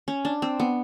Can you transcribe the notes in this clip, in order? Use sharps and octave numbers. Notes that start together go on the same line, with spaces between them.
C#4
D4
C4
B3